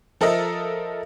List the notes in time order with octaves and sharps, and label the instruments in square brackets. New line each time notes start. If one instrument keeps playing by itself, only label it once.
[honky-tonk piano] F3 A4 A#4 D#5 E5